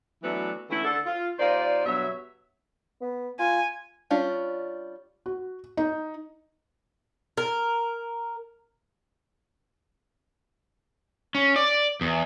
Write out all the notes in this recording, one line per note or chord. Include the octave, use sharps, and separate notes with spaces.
E3 F#3 A3 B3 D4 F#4
D3 E3 A3 C#4 E4
D3 A4
F4
D#2 D#4 F4 C5 D5
G2 B2 F#3 E5
B3
F4 G#5
G3 C#4 D4 F4
F#4
D#4
A#4
C#4
D5
E2